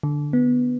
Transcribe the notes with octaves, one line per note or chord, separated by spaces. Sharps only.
D3
B3